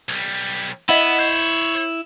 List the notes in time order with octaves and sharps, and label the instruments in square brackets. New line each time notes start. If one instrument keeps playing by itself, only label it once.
[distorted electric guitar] B1 G3
[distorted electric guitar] B3 [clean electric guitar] E4 [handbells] D#5 E5 F#5
[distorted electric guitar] C5 C#5 [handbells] G6